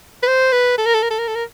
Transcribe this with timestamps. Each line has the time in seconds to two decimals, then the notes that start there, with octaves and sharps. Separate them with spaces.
0.23 B4
0.28 C5
0.52 B4
0.78 A4
0.86 A#4
0.94 A4
1.03 A#4
1.10 A4
1.19 A#4
1.28 A4
1.35 A#4